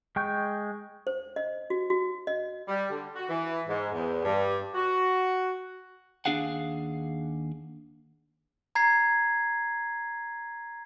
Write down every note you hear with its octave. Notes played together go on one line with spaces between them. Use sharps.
G#3 G5 C#6 G6
C5
D#5
F#4
F#4
D#5
G3
D3
F#4
E3
G#2
E2
G2
F#4
D#2 D4 G#4 F5 F#5
A#5 G#6 C7